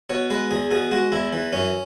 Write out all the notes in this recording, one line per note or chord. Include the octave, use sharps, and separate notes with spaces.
B2 C#5
G#3 B4
E2 G#4
B2 G#4
G#3 F#4
E2 E4
E3
F#2 C#4